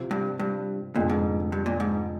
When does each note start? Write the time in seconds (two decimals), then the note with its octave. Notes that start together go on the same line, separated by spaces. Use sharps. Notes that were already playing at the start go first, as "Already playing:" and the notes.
Already playing: C3 F3 C4
0.11 G2
0.39 G2
0.96 F1 F2 A#2 D3 G#3
1.09 G#2
1.52 G2
1.66 A#2
1.80 G#2